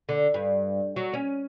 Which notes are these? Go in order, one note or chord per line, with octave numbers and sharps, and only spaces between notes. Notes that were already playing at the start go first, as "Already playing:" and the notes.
D3
G2
F#3
C#4